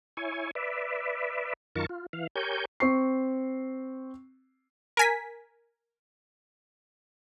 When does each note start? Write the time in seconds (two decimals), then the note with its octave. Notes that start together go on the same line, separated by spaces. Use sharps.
0.17 E4 C#5 G#5
0.55 B4 D5 E5
1.76 F#2 D#3 F4 A#4 A5 C#6
1.89 F4
2.13 E3 F5
2.36 G4 A#4 C#5 G#5 G6
2.80 C4 C#6 C7
4.97 A#4 G#5 B6